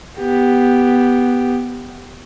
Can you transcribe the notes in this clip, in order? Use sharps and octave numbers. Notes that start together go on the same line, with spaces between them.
B3 G4